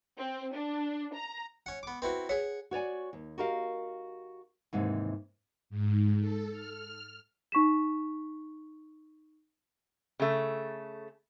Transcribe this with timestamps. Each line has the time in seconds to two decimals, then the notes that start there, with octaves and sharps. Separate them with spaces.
0.17 C4
0.54 D4
1.14 A#5
1.66 C#4 F#5
1.83 B3 D6
2.02 C4 E4 F#4 B4
2.29 G#4 C#5 F#5
2.71 F#4 C#5 D5 G#5
3.13 D#2
3.38 F#4 G4 A#4 D#5 F5
4.73 D#2 G#2 C3 E3
5.70 G#2
6.20 A4
6.52 F6
7.52 D#4 C#6 B6 E7
10.20 C#3 A3